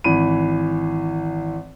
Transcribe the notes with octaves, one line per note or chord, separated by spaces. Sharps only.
G#1 E3 B5 D#7